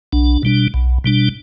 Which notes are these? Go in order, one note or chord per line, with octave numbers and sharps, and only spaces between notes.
B1 D4
B2 G3 D4
B1
B2 G3 D4